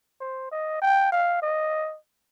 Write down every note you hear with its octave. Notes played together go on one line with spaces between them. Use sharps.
C5
D#5
G5
F5
D#5